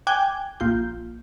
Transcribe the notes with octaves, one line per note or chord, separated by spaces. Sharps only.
G5 G#5 D6 F#6 G#6
A#1 F4 G6